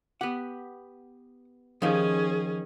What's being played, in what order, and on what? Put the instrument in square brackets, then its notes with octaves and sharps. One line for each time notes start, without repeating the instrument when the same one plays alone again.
[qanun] B3 G4 [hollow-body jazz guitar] F#5
[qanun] D#3 [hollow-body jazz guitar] F3 D#4 G4 [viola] C#4 G#4